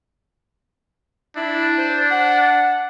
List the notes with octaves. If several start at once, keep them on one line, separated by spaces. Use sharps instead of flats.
D4 E4
C5
F#5